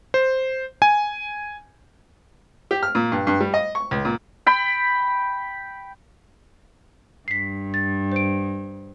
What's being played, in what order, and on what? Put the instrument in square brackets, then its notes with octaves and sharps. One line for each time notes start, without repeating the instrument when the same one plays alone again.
[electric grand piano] C5
G#5
[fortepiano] G4
F6
A#2
G2
G2
G3
D#5
C#6
C#2
A#2
[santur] G5 B5
[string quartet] G2 [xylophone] B6 C7
[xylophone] A6
C5 D7